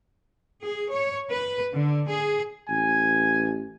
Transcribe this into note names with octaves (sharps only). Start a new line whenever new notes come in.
G#4
C#5
B4
D3
G#4
A1 G#5